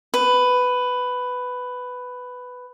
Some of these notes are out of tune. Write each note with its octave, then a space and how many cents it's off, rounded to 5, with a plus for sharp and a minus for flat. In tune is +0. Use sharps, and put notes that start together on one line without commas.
B4 +10